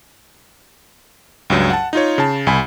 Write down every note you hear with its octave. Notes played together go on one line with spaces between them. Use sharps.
C#2 G2 F#3
F#5 A5
D#4 F4 C#5
C#3 A5
C2 G#5 B5